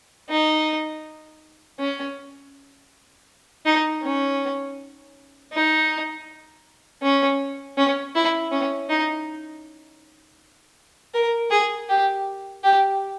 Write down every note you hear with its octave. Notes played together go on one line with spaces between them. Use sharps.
D#4
C#4
D#4
C#4
D#4
C#4
C#4
E4
C#4
D#4
A#4
G#4
G4
G4